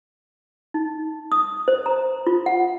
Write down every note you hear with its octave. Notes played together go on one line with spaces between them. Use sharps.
D#4
D#6
C5
A#5
F4
F#5